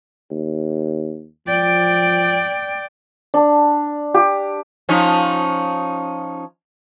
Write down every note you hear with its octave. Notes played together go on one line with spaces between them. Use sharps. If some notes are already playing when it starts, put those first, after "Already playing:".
D#2
F3 D5 G5
D4
G4
F3 C#4 D#4